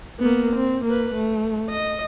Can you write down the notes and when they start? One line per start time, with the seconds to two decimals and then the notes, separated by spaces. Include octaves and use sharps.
0.20 A#3 B3
0.55 C4
0.85 A#3 B4
1.15 A3
1.70 D#5